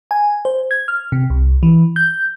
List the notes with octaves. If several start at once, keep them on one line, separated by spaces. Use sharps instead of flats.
G#5
C5
G#6
F6
C3
C2
E3
G6